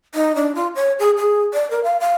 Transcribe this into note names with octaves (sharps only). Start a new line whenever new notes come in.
D#4
D4
F4
C#5
G#4
G#4
D5
A#4
F5
F5